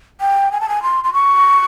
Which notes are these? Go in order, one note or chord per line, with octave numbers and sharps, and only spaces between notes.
G5
G#5
A5
G#5
C6
C6
C#6